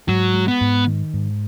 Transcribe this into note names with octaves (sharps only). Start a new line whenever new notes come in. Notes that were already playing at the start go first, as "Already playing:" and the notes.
G#2 F#3
G#3
B3
G#2
D#3
G#2